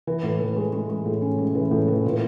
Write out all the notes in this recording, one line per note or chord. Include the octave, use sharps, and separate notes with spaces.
E3
A2
E3
G#3
G#3
G#3
A2
C#4
G#3
E3
A2
E3
A#2